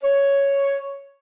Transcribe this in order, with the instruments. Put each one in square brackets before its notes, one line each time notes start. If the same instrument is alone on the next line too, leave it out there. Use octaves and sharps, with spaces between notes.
[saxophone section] C#5